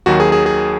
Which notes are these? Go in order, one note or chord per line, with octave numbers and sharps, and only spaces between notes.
D#2 D#3 F#3 F#4
G#4
G#4
G#4